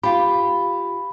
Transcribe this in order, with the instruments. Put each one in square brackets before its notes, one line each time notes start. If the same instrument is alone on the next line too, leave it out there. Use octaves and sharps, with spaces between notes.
[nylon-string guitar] F4 G4 [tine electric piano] B5